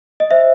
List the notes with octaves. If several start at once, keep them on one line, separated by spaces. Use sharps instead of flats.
D#5
C5 E5